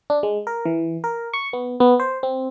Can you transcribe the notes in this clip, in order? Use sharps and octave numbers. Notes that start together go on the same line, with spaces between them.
D4
G#3
A#4
E3
A#4
C#6
B3
B3
C5
C4